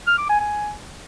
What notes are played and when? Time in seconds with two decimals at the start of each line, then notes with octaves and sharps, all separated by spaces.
0.07 F6
0.18 D6
0.30 G#5
0.41 G#5